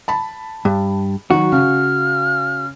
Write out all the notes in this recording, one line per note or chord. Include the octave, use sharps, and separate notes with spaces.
A5 B5
G2
D#3 F#3 F#4
C#3 F6